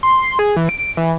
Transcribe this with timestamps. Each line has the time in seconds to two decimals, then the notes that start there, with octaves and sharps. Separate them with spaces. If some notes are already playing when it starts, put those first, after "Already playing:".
0.03 C6
0.39 G#4
0.57 E3
0.69 D7
0.97 E3